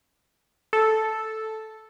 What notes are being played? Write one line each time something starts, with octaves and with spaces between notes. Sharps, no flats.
A4